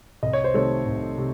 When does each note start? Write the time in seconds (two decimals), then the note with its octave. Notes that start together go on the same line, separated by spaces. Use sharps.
0.23 C2 D#5
0.33 C#5
0.44 C5
0.54 C3 D#3 A3 A4 C#5
0.86 C2
1.18 C3